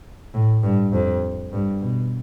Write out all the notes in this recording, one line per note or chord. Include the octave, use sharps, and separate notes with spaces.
A2
G2
F2
G2
B2